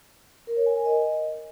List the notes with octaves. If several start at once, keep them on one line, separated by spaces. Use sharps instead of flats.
A#4
C#5
G#5
A#4
D#5